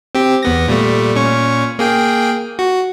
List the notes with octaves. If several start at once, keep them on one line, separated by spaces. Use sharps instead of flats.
C4 G4
E2 B3 A#6
A#2 G3 A3
A#2 C#4 C#6
A#3 G#4 G5
F#4